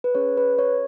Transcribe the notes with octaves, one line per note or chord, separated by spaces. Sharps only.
B4
C#4 G#4 C#5
B4
C#5